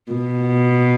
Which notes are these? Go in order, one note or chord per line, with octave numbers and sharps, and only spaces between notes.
B2